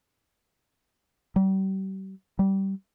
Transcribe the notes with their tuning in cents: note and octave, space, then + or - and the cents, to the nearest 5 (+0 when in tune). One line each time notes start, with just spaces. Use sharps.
G3 -40
G3 -20